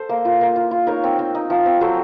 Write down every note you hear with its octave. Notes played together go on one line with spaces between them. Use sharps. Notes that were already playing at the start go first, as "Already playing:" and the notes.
Already playing: A4 C5
A#3
F4
A#3
F4
F4
D#4 A#4 C#5
C4
C4
D#4
F3
C4
F#3 A4 C5